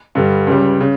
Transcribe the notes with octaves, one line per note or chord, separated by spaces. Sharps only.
G2 D3 G3
C#2 C#3 G3
C#3